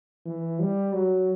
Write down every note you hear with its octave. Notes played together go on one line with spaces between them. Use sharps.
E3
G3
F#3